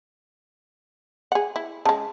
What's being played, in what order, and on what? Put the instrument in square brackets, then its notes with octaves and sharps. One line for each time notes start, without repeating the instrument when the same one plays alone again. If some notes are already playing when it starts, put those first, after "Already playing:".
[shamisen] G#4 F#5
E4
[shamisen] C#3 G#3 [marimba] A5